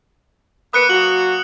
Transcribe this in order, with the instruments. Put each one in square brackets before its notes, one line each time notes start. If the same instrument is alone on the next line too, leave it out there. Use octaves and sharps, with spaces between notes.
[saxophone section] A#3 B4 [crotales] D#6 F#6 C#7
[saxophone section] F#3 A#3 F#4 [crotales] F#7